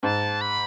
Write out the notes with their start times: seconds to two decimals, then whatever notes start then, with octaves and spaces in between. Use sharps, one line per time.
0.03 G#2 A5
0.41 B5